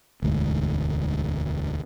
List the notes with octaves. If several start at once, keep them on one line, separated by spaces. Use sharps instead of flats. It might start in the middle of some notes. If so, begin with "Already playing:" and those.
E1 D2 G#2